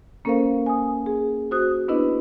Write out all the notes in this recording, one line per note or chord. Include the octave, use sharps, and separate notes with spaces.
A#3 C#4 A4 A#4 C5 F5
G#5 D#6
G#4
F#4 C5 D#6 F#6
B3 D4 E4 B4 D#5